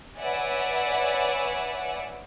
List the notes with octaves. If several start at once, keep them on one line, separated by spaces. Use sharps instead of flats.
B4 C#5 D5 E5 F#5 G#5